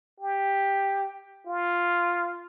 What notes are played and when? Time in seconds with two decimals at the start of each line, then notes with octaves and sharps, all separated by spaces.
0.20 G4
1.47 F4